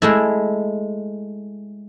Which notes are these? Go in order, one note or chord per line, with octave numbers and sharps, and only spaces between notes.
G#3 A3 E4